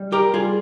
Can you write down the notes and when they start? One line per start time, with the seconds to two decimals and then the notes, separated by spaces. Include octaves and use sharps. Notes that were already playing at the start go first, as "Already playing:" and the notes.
Already playing: G3
0.12 G4 A#4
0.34 G3 F4 G#4